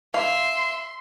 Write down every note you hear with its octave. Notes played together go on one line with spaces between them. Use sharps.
E5 F5 C6